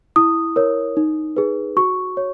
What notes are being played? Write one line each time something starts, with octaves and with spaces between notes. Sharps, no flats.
E4 D#6
A#4 C#5
D#4
G#4 B4
F#4 C#6
C#5